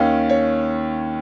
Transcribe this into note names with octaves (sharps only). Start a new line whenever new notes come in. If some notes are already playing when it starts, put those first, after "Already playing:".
Already playing: D#2 D#3 C#4 F5
C#5